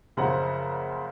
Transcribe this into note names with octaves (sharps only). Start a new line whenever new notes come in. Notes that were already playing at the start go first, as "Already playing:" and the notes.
F#1 C#3 F3 C4 F#5 A#5